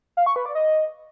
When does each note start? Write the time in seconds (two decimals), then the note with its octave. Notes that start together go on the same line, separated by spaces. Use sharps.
0.17 F5
0.26 C#6
0.36 B4
0.46 D5
0.55 D#5